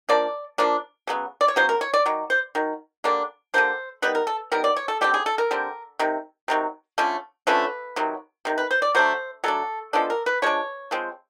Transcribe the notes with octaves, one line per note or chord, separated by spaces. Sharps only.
F3 A#3 D4 D5
F3 A#3 D4
C#3 F#3 B3
D5
C#5
C#3 F#3 B3 C5
A#4
C#5
D5
D#3 F#3
C5
D#3 F#3
D3 G3 A#3 D4
D3 G3 A#3 D4 C5
D#3 G3 B3 B4
A#4
A4
D#3 G3 B3 A#4
D5
C#5
A4
D3 G3 C4 G4
G#4
A4
A#4
D3 G3 C4
C3 D#3
C3 D#3 F#3
D3 F3 A3 C#4
D3 F3 A3 C#4 B4
C3 D#3 F#3
C3 D#3
B4
C5
D5
F#3 A3 D4 C5
F#3 A3 D4 A4
F3 G#3 B3 D4 A4
A#4
B4
F3 G#3 D4 C#5
F3 G#3 C4